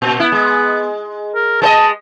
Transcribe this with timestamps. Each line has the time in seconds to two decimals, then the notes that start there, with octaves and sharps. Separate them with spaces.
0.02 A#2
0.20 B3 E4
0.32 G#3
1.35 A#4
1.62 G#3 B4 D#5 A5